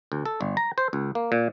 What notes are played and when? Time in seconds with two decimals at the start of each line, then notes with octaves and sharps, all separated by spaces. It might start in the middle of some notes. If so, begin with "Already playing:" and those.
0.12 D2
0.25 A4
0.41 G1
0.57 A#5
0.78 C5
0.93 C#2
1.15 A#3
1.32 A#2